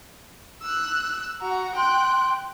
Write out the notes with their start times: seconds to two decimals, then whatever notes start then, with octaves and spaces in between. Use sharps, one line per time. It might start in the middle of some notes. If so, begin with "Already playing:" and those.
0.62 E6 F#6
1.42 F#4 F#5 A#5
1.76 G5 C6 F#6